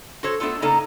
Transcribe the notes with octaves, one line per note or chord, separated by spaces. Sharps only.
F#4 A4 C5 C#5
A3 B3 D4 F4 A4
C#3 A#3 D#4 A4 D5 A#5